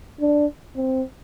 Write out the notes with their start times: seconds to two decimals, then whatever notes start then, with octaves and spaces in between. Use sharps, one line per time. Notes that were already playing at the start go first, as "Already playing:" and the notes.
0.21 D4
0.76 C4